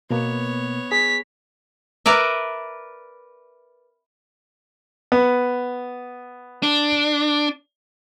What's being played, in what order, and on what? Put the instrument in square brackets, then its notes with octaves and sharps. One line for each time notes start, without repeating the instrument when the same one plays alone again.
[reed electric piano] B2 A#3 [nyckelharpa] B3 C#5
[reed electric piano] G#4 [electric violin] B6
[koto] A#4 B4 D5 E5
[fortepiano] B3
[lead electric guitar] D4